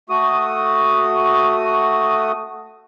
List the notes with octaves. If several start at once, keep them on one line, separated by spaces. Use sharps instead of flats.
A3 F#4 D#6